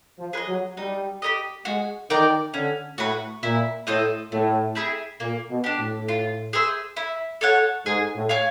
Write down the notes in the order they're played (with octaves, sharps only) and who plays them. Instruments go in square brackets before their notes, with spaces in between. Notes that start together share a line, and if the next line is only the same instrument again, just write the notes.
[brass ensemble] F3
[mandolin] G#4 B4
D#5
[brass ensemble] F#3
[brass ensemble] G3 [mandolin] D#4
[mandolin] G4 A#4 D#5
[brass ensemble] G#3 [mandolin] F#4
[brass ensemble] D#3 [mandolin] A#4 D5 G5
[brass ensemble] D3 [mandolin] C#4
[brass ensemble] A2 [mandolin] F#4 B4
[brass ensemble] A#2 [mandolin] E4
[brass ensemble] A2 [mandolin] A4 C5 D#5
[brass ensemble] A2 [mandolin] A3
[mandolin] C4 E4 G#4
[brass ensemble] A#2 [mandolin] A#3
[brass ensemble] B2
[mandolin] D4 G4
[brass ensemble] A2
[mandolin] F4
G#4 C5 E5
E4
A4 C#5 F#5
[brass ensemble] G#2 [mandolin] G#4
[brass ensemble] A2
[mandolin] C#5 F5 G#5